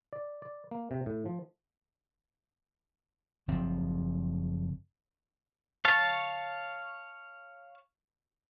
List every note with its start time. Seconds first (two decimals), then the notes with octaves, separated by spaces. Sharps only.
0.13 D5
0.42 D5
0.71 A#3
0.91 C3
1.06 A2
1.26 F3
3.48 F#1 F3 C4
5.85 C#5 F5 A5